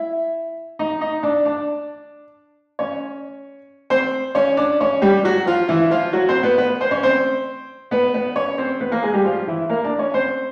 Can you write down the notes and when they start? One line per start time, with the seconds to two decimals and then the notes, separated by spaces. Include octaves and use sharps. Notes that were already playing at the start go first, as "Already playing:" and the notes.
Already playing: E4 E5
0.79 D#4 D#5
1.01 D#4 D#5
1.23 D4 D5
1.45 D4 D5
2.79 C#4 C#5
3.90 C4 C5
4.35 C#4 C#5
4.57 D4 D5
4.81 C#4 C#5
5.02 G3 G4
5.24 F#3 F#4
5.46 F3 F4
5.69 E3 E4
5.91 F3 F4
6.13 F#3 F#4
6.29 C4 C5
6.43 B3 B4
6.58 B3 B4
6.81 C5
6.91 C#4 C#5
7.03 C4 C5
7.91 B3 B4
8.14 B3 B4
8.36 C#4 C#5
8.58 C4 C5
8.81 B3 B4
8.91 A#3 A#4
9.03 G#3 G#4
9.14 G3 G4
9.25 F3 F4
9.47 E3 E4
9.69 A#3 A#4
9.84 D4 D5
9.99 C#4 C#5
10.14 C4 C5